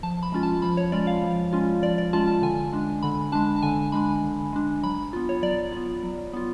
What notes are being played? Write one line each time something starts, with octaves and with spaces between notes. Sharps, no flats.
F3 A5
B5
G#3 C#4 F4
A5
F3 B5
C#5
G#3 C#4 F4 D5
F5
F3
G#3 C#4 F4
F3 D5
D5
G#3 C#4 F4 A5
A5
D3 G#5
G#3 D4
D3 B5
G#3 D4 A5
A5
D3 G#5
G#3 D4 B5
D3
G#3 D4
F#3 B5
B3 F4
C#5
F#3 D5
B3 F4
F#3
B3 F4